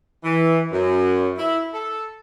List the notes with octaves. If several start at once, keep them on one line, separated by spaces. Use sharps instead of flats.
E3
F#2
E4
A4